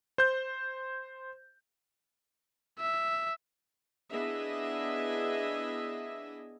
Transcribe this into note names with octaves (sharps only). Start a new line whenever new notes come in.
C5 G6
E5
B3 D4 E4 G#4 D#5 E5